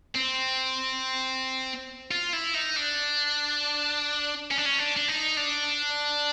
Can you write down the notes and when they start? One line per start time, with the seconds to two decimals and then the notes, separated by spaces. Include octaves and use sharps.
0.15 C4
2.11 F4
2.33 E4
2.54 D#4
2.77 D4
4.51 C#4
4.58 D4
4.65 C#4
4.79 D4
4.97 D4
5.08 D#4
5.37 D4